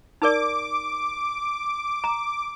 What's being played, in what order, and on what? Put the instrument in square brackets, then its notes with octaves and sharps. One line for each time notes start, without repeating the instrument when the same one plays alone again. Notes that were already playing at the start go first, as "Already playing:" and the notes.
[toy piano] D#4 A#4 D5 [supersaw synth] D6
[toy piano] A#5